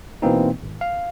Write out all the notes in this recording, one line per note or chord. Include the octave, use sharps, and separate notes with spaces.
B2 E3 A#3 C4 D#4
G#1
F5